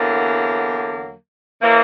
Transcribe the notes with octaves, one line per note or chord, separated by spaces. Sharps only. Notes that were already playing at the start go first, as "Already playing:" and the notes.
Already playing: E2 D3 F#3 A#3
C#3 E3 A#3